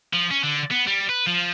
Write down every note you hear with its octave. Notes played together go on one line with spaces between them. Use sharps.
F3
C#4
D3
B3
G3
B4
F3